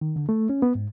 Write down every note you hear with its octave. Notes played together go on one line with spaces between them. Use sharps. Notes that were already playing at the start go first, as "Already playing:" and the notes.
D#3
D3
A3
C#4
B3
G#2